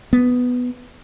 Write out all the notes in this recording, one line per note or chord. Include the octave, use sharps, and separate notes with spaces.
B3